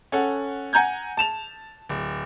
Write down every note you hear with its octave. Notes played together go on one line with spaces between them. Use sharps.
C#4 A4 F#5
F#5 G#5 A#5 G6 G#6
A5 E7 F7
D1